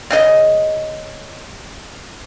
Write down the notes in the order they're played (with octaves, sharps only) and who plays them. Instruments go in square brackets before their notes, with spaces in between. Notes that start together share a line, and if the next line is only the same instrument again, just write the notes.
[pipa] C#3 G#4 D#5